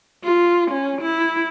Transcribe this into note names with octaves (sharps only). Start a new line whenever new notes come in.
F4
C#4
E4